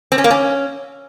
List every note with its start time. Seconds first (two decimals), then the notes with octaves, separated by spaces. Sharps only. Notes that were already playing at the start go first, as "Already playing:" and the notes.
0.12 C4
0.18 C#4
0.24 A#3
0.31 C#4